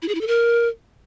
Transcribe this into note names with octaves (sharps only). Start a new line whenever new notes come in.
E4
G#4
E4
A4
A#4